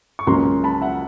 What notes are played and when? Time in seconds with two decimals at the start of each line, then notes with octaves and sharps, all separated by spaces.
0.19 C#6
0.27 C#2 C#3 F#3 A#3 C#4 A#5 C6
0.64 A5 B5
0.81 E5 F#5